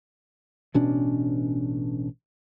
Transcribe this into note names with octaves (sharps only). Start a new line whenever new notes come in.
A1 B2 C#4 D4